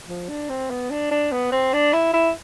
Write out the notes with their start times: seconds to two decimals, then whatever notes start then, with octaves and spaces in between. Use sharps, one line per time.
0.08 F3
0.29 D4
0.49 C4
0.70 B3
0.91 D4
1.11 D4
1.32 B3
1.52 C4
1.73 D4
1.93 E4
2.14 E4